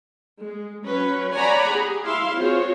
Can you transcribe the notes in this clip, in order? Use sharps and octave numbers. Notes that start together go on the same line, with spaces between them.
G#3
F#3 C#4 B4
C#5 D5 F#5 G#5 A#5 B5
G4 G#4
E4 E5 F5 C6
C4 F4 F#4 G#4 C5 C#5